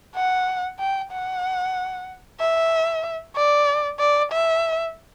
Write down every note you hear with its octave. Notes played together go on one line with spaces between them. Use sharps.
F#5
G5
F#5
E5
D5
D5
E5